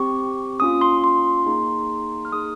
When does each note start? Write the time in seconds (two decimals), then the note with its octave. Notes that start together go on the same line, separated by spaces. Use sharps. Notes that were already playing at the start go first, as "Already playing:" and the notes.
Already playing: C4 G4 C#6
0.60 A#3 C#4 F4 D#6
0.81 C6
1.04 C6
1.46 A#3 D#4 G#4
2.25 F6
2.32 A#3 D#4 G#4 D#6